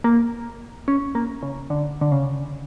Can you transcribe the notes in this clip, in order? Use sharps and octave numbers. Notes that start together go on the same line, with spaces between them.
A#3
C#4
A#3
C#3
D3
D3
C#3